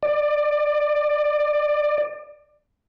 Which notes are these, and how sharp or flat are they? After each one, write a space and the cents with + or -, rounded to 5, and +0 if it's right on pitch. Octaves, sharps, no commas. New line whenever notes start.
D5 +25